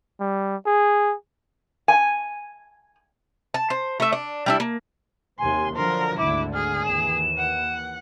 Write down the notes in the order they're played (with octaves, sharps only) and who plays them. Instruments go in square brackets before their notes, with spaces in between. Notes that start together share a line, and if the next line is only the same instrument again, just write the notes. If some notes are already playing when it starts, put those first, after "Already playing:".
[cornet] G3
G#4
[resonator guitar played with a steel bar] G#5
[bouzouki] A5
C5
A3 E5
D4
G3 D4 E4
A#3
[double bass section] D#2 C3 [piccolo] G#5 [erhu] C6
[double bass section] D3 F3 F#3 [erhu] A#4 [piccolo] C6
[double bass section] G#1 D2 D3 [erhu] E4 [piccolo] D6
[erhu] G#4 [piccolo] F6
[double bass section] D#2 E3 [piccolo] E7
[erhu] F#5